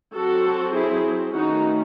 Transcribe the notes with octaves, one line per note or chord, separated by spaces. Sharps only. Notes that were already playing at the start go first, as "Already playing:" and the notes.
F#3 C4 F#4 A4
E4 G#4
D#3 A3 C#4 D#4 F#4